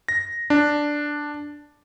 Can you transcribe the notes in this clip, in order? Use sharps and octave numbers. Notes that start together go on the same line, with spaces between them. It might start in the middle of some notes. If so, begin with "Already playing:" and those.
A#6
D4